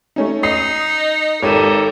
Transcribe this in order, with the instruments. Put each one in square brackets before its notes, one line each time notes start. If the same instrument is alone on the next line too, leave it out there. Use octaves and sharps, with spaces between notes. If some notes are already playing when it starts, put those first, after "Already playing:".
[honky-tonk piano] A3 C#4 D#4
[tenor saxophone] D#4 [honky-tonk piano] D#6 C7
[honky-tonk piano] G#1 D#7 [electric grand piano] D#4 G4 C#5 [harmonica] A4 A#4